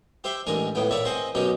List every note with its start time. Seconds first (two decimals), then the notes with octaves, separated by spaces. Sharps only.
0.24 G4 C5 E5 G5
0.47 A1 G#3 D4 A#4 G#5
0.75 C#2 A2 B3 G5
0.91 A#2 C#5 D5 E5 A5 B5
1.05 C4 G#4 C5 D#5 F#5
1.35 F#2 B2 C#4 D#4 G4